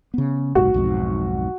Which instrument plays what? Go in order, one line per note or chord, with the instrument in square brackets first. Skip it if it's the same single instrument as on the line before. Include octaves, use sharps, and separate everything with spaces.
[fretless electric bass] C#3 B3
[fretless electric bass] F#1 B1 G#2 [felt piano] F#4
[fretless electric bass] B1 F2 G#2